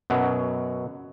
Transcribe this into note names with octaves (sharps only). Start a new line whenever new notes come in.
F#2 B2 F#3